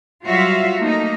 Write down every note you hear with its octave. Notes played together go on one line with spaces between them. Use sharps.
F#3 G3 F4 F#4 E5 F5
A3 A#3 D#4